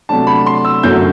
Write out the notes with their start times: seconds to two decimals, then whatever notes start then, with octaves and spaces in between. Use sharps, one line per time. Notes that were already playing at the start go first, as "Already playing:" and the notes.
0.09 C3 F#3 A3 D4 A5
0.27 B5
0.46 C6
0.65 E6
0.83 F#2 D3 F#3 A3 G6